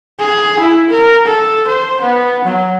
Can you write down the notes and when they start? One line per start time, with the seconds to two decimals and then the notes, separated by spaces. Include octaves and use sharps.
0.19 G#4
0.60 E4
0.90 A#4
1.26 A4
1.68 C5
2.01 B3
2.45 F#3